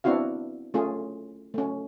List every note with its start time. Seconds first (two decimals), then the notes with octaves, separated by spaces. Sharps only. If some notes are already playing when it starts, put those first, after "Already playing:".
0.04 B3 C4 D4 E4 F#4 F5
0.74 A3 C#4 F4 G#4
1.54 A3 C#4